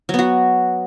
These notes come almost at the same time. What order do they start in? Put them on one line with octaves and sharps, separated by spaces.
F#3 B3 F#4